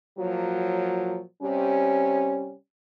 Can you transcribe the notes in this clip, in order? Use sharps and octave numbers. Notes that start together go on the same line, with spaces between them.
A#2 F3 F#3
C3 G3 C#4